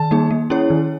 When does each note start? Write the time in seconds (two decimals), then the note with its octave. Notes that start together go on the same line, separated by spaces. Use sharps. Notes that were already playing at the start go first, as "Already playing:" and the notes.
Already playing: D#3 A5
0.11 G3 A#3 D#4 G#4
0.31 A#3
0.50 C#4 E4 G#4 C#5
0.70 D#3